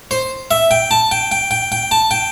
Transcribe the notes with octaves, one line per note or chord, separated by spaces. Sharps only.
C5
E5
G5
A5
G5
G5
G5
G5
A5
G5